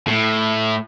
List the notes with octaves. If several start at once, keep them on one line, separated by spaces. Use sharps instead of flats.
A2